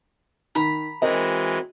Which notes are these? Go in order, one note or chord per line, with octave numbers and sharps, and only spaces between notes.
D#3 A#5 B5
E3 G#3 C4 F#4 A#4 D#5